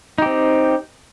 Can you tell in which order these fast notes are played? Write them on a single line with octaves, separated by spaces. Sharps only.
D#4 G4 C4